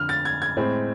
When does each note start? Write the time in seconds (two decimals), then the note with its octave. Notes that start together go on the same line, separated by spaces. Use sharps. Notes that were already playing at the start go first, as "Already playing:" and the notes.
Already playing: F2 D3 F6
0.09 A6
0.25 G#6
0.42 G#6
0.57 A2 G#3 C4